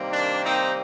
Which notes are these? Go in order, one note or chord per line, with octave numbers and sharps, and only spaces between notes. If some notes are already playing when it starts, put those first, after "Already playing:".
Already playing: C3 D#3 G3 A#3
D4
C4 D#4